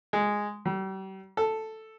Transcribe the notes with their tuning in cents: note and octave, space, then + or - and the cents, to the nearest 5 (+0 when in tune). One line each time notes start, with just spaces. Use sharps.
G#3 -5
G3 -40
A4 +0